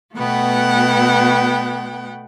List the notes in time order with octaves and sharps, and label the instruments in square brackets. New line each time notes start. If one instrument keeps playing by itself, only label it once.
[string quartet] B2 A3 B3 F#5 G5